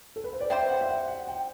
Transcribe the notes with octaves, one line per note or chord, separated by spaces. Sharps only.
A4
B4
C5
D5
G3 C4 G4 C5 E5
F#5
E5
F#5
F#5
G5